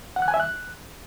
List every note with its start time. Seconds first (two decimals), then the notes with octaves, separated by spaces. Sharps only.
0.16 F#5
0.22 F#6
0.28 G#5
0.34 E5
0.40 F#6